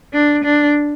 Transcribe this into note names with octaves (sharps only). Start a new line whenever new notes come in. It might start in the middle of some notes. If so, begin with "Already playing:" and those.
D4
D4